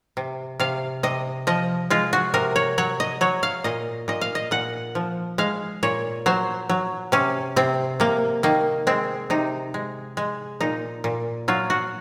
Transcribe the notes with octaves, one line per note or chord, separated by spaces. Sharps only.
C3
C3 F5
C3 D#5
F3 D#5
G#3 F4
F#4
C3 A#4
C#5
F#3 C#5
D#5
F#3 C#5
F5
A#2 D#5
A#2 D#5
F5
D#5
A#2 F#5
F3
G#3 F5
A#2 C#5
F#3 C5
F#3
C3 C#4
C3 C4
C3 A#3
D#3 A#3
G#3 C4
C3 D#4
G#3
G#3
A#2 D#4
A#2
F#3 F4
F#4